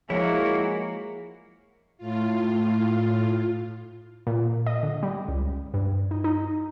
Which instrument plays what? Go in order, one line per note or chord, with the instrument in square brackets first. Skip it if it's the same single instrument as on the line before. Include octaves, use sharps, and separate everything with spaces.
[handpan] F3 C#5 [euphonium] G#3 [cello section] A#3 [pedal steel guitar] E4 F#4
[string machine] A2 F4
[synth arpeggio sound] A#2
D#5
D3
G3
C#2
G2
D#4
D#4